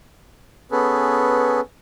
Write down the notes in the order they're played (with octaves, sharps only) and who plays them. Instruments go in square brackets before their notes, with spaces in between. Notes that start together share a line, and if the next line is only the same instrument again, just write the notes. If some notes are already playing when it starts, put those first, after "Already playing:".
[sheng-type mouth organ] B3 C#4 G#4 A4 B4